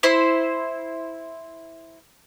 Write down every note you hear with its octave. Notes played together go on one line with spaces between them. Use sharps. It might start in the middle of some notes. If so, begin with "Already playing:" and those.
E4 C5 C6